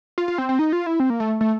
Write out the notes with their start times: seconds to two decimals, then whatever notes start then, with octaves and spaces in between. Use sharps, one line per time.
0.18 F4
0.28 F4
0.38 C4
0.49 C4
0.59 D#4
0.73 F4
0.86 E4
1.00 C4
1.10 A#3
1.20 A3
1.41 A3